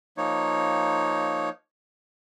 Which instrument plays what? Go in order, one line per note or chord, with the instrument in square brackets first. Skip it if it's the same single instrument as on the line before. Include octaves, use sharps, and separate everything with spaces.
[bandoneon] F3 A#3 D#4 C#5